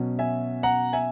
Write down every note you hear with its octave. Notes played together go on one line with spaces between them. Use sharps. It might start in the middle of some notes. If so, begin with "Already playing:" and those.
Already playing: B2 F#3 C#4
E5 G#5
F#5 A#5
E5 G#5